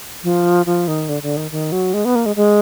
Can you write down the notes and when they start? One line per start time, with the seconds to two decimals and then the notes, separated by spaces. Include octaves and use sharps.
0.24 F3
0.66 F3
0.88 D#3
1.09 D3
1.23 D3
1.37 D#3
1.51 D#3
1.72 F#3
1.94 G#3
2.05 B3
2.15 A#3
2.26 G#3
2.36 G#3